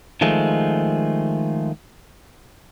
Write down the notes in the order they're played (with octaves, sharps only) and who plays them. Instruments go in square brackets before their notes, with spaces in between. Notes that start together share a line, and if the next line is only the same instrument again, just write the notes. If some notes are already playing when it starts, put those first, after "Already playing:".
[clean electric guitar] D#3 F3 G#3 A3